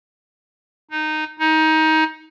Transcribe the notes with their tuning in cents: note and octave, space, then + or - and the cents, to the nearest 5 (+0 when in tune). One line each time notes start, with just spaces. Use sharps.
D#4 -10
D#4 +20